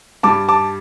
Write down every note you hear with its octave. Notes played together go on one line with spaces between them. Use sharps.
G2 G3 A5 D6
A5 D6